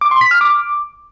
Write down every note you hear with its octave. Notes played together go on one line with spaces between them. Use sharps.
D6
C6
B6
F6
D6